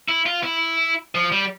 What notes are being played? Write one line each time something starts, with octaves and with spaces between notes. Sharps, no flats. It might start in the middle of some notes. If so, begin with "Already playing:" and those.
E4
F4
E4
F3
G3